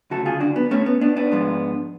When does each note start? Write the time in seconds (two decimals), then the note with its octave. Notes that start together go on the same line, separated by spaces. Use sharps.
0.10 D2 C#3 F#3 A3 F#4 A4
0.26 F4 G#4
0.40 D4 F#4
0.56 B3
0.71 A3 C#4
0.86 B3
1.01 B3 D4
1.16 B3 D4
1.32 G#2 F3 G#3